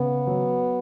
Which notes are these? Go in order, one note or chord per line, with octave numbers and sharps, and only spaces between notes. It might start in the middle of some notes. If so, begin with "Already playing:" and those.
Already playing: C#3 B3
F#3